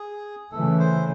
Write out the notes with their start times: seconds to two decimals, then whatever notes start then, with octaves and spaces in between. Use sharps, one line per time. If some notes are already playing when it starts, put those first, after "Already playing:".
Already playing: G#4
0.52 C#3 E3 A3 A4
0.79 C5